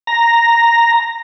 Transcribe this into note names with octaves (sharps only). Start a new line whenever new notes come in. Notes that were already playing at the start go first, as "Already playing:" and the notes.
A#5